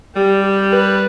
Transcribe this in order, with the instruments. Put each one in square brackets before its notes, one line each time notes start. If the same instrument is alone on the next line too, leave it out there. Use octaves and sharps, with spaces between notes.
[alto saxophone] G3 [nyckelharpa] G4
[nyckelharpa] G4
B4